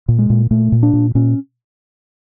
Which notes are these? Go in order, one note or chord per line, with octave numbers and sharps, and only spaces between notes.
A#2
G#3
A#2
A#2 A3
A#2
D4
A#2
A#2 C#4